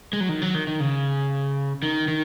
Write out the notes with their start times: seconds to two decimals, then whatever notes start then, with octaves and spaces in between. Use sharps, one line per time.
0.13 G#3
0.21 F#3
0.29 D#3
0.42 F#3
0.54 D#3
0.67 D#3
0.80 C#3
1.83 D#3
2.08 D#3